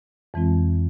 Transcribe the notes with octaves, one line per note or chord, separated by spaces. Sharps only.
F2 E3 G#3 C4 F4